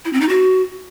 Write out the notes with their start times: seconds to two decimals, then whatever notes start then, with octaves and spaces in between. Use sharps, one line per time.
0.05 E4
0.13 C4
0.21 D#4
0.29 F#4